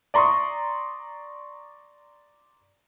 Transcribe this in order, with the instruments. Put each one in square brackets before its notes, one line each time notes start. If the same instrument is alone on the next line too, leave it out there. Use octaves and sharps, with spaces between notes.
[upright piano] D5 A#5 C6 C#6 D#6